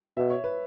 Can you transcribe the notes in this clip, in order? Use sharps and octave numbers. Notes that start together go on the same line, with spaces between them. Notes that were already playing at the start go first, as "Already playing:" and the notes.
B2 E5
C#5
B4